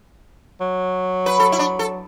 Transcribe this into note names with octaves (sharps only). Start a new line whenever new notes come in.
F#3
B4
A4
E4
D4
A4